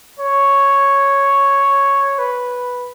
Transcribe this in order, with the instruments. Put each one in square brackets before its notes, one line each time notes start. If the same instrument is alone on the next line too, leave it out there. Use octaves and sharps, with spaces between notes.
[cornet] C#5
B4